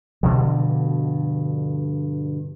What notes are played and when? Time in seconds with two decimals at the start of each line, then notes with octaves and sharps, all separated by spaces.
0.23 G2 B2 D3 F3